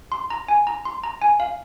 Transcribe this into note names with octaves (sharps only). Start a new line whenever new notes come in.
C6
A#5
G#5
A#5
C6
A#5
G#5
F5